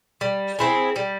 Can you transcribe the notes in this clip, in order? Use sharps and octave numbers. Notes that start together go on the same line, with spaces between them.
G3
C4 E4 G#4
G3